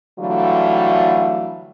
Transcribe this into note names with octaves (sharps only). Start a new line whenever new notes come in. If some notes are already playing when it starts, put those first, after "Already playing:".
D3 E3 F#3 G3 A3 F4